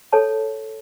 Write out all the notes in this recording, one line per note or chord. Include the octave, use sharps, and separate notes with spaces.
A4 C#5 A5